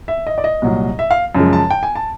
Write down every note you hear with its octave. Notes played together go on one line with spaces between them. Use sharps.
E5
D#5
D5
D#5
C2 A#2 F#3
E5
F5
F#2 C#3 F3 G#3
A5
G5
G#5
A5